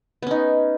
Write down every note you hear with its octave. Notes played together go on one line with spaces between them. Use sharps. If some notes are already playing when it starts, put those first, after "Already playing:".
B3 C#4 D#4